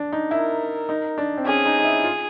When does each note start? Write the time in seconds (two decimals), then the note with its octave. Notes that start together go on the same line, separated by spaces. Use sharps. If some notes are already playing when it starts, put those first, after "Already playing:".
Already playing: D4
0.13 D#4
0.31 E4 A#4
0.89 D#4
1.18 D4
1.37 C4
1.46 C#4 G#4
1.66 D#4
1.79 D#4
1.85 E4
2.04 F4